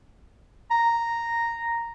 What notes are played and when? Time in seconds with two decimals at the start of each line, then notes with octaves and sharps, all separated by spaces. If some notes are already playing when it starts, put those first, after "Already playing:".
0.71 A#5